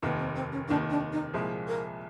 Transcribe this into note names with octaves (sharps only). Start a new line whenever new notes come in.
F1 D#2 D#3 B3
C4
C4
C#4
F1 D#2 D#3 D4
D4
D#4
C2 A#2 F3 G#3 G#4
A#4